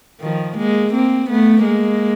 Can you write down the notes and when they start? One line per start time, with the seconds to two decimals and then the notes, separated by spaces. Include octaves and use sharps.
0.21 D#3 F3
0.57 G#3 A#3
0.94 A#3 C4
1.30 A3 B3
1.66 G#3 A#3